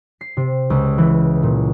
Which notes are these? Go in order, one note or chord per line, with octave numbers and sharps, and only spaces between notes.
C7
C3
C#2
E3
A#2